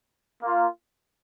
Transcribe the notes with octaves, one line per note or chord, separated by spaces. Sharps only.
A#3 F4